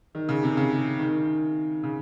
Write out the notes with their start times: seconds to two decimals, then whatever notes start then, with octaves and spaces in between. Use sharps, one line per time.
0.15 D#3
0.29 C#3
0.43 C3
0.57 C#3
0.99 D#3
1.83 C#3